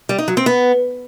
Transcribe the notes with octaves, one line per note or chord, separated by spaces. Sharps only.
G3
D#4
F#3
C4
B3